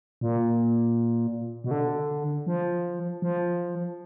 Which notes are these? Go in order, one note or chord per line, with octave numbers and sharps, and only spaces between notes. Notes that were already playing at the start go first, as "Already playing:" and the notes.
A#2
B2
D3
F3
F3